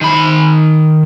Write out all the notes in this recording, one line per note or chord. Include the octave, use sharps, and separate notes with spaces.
D#3 B5